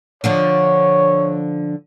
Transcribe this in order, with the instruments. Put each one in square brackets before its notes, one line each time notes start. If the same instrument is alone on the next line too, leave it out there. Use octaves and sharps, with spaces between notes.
[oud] D3 F3 D4 [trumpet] C#5